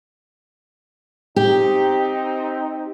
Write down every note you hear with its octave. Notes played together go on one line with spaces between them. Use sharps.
C4 D#4 G4